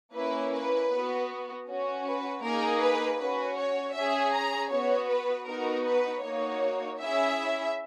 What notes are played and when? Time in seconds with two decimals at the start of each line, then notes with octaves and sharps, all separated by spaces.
0.15 A#3 C#4 E4 B4
0.53 B4
0.91 B3 F#4
1.67 C#4 F#4
2.05 B4
2.43 A#3 D#4 G#4 A#4
2.81 B4
3.19 C#4 F#4 B4
3.57 C#5
3.95 C#4 G#4 E5
4.33 A#5
4.71 B3 F#4 C#5
5.10 B4
5.48 B3 D#4 F#4 A#4
5.85 B4
6.23 A#3 D#4 F#4 C#5
6.99 C#4 E4 G#4 E5